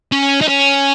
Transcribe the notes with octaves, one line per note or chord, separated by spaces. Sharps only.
C#4
D#4
C#4